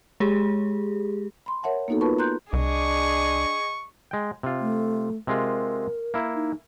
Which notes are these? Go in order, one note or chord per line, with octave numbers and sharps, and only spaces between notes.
G#3 G4 G#4
B5 C6
A#4 C#5 E5 F#5 A5
A#3 B3 D#4 F#4 A4
F4 A#4 B4 A5 B5 C#6
A#5 C6 F#6 G6
C2 D4 G#4 D#5 C#6
G#3 G5
C3 F4
A3
C3 G#3 F4 A#4
A#3 E4
D#4